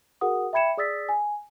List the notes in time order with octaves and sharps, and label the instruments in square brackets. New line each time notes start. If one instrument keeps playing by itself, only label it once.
[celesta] F#4 G#4 A#4 F#5 D#6
E5 G5 B5 G#6 C#7 E7
G#4 D5 D#6 E6 A6 B6
G#5